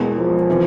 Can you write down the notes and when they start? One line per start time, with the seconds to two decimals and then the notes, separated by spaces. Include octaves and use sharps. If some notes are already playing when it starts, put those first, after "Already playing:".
Already playing: E1 E2 B2 G#3
0.17 F3
0.50 C3 E3